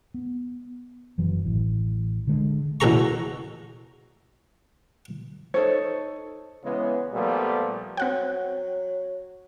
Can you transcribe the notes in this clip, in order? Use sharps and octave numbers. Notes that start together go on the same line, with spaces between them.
B3
F#1 E3 F#3
A1 E3
D3 G#3
A1 B2 G#4 A4 A#5 C#6
D#4 A4 C5 C#5
C#3 E3 G#3 B3
A#2 F3 G3 A3 B3
F#3 C4 F#5 G5